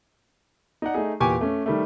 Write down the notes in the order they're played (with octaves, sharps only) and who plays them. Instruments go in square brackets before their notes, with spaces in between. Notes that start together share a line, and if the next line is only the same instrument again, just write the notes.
[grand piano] D#4 D5 F#5
A3 D#4 G#4
E2 A#2 G4 G#5 C#6 D6
A3 C#4
D#3 G3 A3